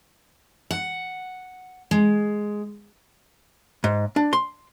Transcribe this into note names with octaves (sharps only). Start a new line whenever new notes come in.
F#5
G#3
G#2
D4
C6